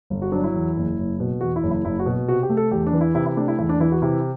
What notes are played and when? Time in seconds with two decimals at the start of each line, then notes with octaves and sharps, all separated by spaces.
0.10 G1
0.22 F#4
0.32 F#3 D4
0.44 E4
0.54 E2
0.76 F#1
0.98 F#1
1.20 B2
1.41 E2 F#4
1.56 E4
1.63 F#1
1.71 E4
1.85 F#1 E4
1.99 F#4
2.06 B2
2.28 C3 F#4
2.43 G4
2.50 A3
2.57 A4
2.71 E2 G4
2.87 D4
2.93 E3
3.01 E4
3.15 C3 E4
3.26 E4
3.37 A3 D4
3.48 E4
3.59 E2 E4
3.69 D4
3.80 E3 E4
3.92 F#4
4.02 C3 E4